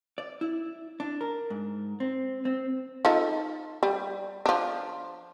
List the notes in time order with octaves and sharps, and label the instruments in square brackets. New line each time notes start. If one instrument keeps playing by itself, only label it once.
[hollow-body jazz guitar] D5
E4
D4
A#4
G#2
C4
C4
[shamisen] D#4 F4 A4
G3
F3 D4